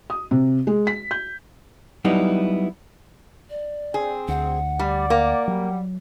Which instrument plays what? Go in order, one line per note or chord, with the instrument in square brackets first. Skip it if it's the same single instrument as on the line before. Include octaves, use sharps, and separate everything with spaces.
[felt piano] D#6
C3
G#3
B6
G6
[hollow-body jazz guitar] F#3 G3 B3 D#4 E4
[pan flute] D5
[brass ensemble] C4 [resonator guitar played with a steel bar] G#4
[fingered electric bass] D2 [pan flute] F#5
[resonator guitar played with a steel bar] G3 [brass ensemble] D5
[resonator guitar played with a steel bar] A#3
[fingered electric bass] F#3 [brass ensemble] G3